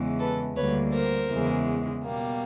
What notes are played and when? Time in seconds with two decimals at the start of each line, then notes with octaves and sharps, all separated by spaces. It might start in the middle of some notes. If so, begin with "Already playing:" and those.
Already playing: E2 C#3 E3 G#3
0.19 A4 B4
0.56 D2 D3 G3 A#3 B4 C#5
0.93 A#4 C5
1.29 E2 C#3 E3 G#3
2.03 B2 G3 A#3